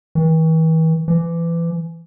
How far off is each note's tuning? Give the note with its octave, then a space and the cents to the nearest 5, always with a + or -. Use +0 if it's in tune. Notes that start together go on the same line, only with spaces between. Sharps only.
E3 -40
E3 +30